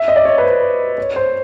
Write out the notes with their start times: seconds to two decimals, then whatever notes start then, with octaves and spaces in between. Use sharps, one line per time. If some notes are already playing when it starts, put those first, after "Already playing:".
Already playing: E5
0.08 D#5
0.16 D5
0.25 C#5
0.38 B4
0.44 C5
0.98 C#5
1.16 C5